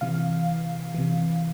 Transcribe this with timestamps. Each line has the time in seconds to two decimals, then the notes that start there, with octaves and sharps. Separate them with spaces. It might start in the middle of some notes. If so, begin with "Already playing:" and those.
0.01 C3 E3 F5
0.94 C3 E3